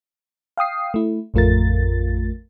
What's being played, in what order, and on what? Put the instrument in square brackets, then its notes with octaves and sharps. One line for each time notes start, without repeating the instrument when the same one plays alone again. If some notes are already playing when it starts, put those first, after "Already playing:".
[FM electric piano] F5 G5 D#6 C7
A3 E4
A1 F2 A3 F4 A#4 A6